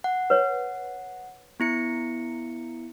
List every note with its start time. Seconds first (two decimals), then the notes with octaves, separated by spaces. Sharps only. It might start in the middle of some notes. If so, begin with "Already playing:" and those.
0.04 F#5
0.30 B4 C#5
1.60 B3 E4 C#7